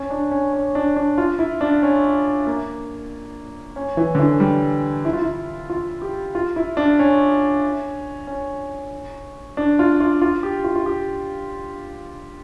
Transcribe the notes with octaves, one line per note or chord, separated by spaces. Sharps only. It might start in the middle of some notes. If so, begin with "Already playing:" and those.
Already playing: C#4
D4
C#4
C#4
D4
D4
F4
E4
D4
C#4
A#3
C#4
E3
D3
E3
G3
E4
F4
E4
F4
G4
F4
E4
D4
C#4
C#4
D4
F4
F4
F4
G4
F4
F4
G4